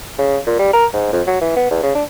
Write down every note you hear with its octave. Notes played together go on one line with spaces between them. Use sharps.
C#3
A#2
G3
A#4
G#2
F2
F#3
E3
B3
E2
C#3
D4